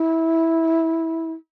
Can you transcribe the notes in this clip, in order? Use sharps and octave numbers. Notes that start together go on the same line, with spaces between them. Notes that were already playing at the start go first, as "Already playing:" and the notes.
Already playing: E4